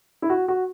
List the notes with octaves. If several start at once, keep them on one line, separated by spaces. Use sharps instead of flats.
E4
F#4
F#4